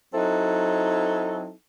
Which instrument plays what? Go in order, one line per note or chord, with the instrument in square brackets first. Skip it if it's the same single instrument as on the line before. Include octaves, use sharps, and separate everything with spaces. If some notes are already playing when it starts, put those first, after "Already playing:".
[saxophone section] F#3 C4 D#4 E4 A4